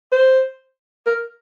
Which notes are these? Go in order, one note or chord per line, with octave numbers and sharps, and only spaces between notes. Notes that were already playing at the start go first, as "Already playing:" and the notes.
C5
A#4